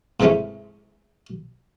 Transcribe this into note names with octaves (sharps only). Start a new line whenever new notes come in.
G#2 C3 E3 G#3 A3 C#4